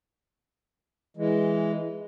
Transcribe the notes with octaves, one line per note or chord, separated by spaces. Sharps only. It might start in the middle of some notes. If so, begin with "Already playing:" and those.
E3 G#3